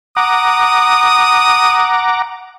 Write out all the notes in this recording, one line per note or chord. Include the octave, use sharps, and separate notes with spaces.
F#5 A#5 D6 D#6